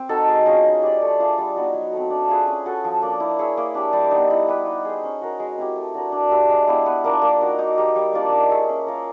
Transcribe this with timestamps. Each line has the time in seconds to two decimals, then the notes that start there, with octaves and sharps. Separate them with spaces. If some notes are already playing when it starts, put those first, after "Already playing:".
Already playing: C4
0.09 D#4 F#4 A4
0.29 G#3
0.46 C#4 F4 G#4
0.64 D#4
0.82 G4 B4 D5
1.02 A3
1.19 D4 F4 G#4
1.38 G3
1.56 B3 D#4 F#4
1.74 F#3
1.93 A3 C4
2.10 D4
2.28 F4 G#4 B4
2.47 C#4
2.66 F#4 A4
2.84 F3
3.02 A#3 D4
3.20 E4
3.39 G#4 C#5 E5
3.57 A#3
3.75 D4 G4
3.93 G3
4.11 B3 D#4
4.31 E4
4.48 G4 B4
4.66 D#4
4.85 G#4 C5
5.04 C#4
5.22 F#4 A#4
5.40 G#3
5.57 C4 E4 G4
5.76 A3
5.94 D4 F#4 A#4
6.12 D4
6.31 G4 B4 E5
6.50 G#3
6.67 B3 E4 G4
6.86 B3
7.04 D4 F4 A#4
7.22 A#3
7.41 D#4 F#4
7.59 D#4
7.77 G4 A#4
7.96 G3
8.13 A#3 D4 F4
8.32 D#4
8.50 G#4 C#5 E5
8.69 C#4
8.87 F4 A#4